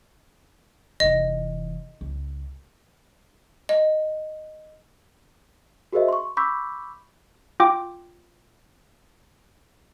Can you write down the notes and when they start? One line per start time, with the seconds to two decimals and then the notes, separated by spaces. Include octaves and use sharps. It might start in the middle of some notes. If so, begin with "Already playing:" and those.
1.00 F1 E3 D#5
2.01 C#2
3.69 D#5
5.93 F#4 G#4 A#4 C5 D#5 E5
6.08 C6 C#6
6.37 B5 C#6 D6 E6 G6 B6
7.60 F4 G5 D6